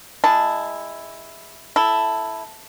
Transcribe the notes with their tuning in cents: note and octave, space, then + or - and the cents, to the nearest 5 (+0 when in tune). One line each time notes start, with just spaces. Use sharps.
G#3 -20 E4 +0 A5 +0
E4 +0 A4 +0